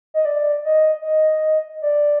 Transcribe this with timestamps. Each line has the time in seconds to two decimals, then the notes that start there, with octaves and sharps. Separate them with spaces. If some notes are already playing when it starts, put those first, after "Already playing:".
0.14 D#5
0.25 D5
0.64 D#5
1.04 D#5
1.82 D5